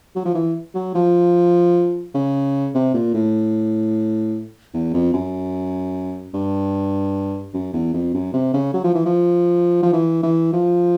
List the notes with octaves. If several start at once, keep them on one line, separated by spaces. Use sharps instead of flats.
F#3
F3
E3
F#3
F3
C#3
C3
A#2
A2
E2
F2
F#2
G2
F#2
E2
F2
F#2
C3
C#3
F#3
F3
E3
F3
F3
E3
E3
F3